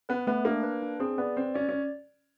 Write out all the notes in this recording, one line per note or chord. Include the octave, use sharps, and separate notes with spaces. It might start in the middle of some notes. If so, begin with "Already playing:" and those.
B3 B4
A3 B3
A#3 D4
B4
D4
C4 G#4
B3 D5
C4 B4
C#4 D5
C#4